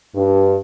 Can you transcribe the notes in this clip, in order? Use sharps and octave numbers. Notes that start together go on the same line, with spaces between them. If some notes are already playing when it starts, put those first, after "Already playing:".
G2